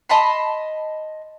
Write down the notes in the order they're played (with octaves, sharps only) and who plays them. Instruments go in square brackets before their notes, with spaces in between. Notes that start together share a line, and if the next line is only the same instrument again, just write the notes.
[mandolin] D#5 A5 B5 C6